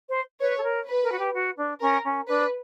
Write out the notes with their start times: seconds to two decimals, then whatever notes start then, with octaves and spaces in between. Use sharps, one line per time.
0.09 C5
0.40 B4 C#5
0.58 A4
0.63 A#4
0.87 B4
1.03 A#4
1.12 F#4
1.19 G4
1.34 F#4
1.57 D4
1.81 C#4 A#4
2.04 C#4
2.28 D4 B4